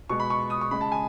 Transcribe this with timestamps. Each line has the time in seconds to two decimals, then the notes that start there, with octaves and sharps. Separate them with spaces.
0.09 B2 G#3 C#6
0.20 B5
0.30 C#6
0.50 D#6
0.61 C#6
0.71 C#3 G#3 B5
0.81 A5
0.92 G#5